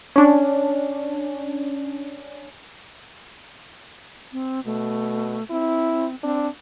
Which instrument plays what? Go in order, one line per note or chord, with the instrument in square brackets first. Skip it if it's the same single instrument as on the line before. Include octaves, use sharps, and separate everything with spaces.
[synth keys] C#4 D4
[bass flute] C4
[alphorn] B2 [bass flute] A3
[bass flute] C4 [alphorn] E4
[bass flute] C4 [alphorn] D4